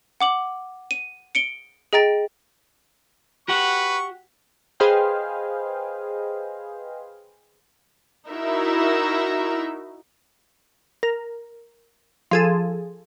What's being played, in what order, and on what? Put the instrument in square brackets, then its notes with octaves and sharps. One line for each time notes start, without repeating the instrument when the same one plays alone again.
[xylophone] F#5 D6 F#7
D#7
C#7 D7 G7
G#4 D#5 G5 A#5 A6 D7
[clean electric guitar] F#4 G4 F#5 [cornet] B4 [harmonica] C#6
[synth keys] G#4 B4 C5 D#5 F5 G5
[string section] D#4 E4 F#4 A#4 E5
[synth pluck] A#4
F3 G#4 A4